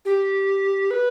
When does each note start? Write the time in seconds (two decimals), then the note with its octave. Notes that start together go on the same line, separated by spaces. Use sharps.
0.05 G4
0.91 B4